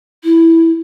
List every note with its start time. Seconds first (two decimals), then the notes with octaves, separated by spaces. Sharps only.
0.24 E4